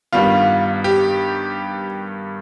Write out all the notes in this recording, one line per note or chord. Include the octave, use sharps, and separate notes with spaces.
G2 D#3 G3 B3 F4
G4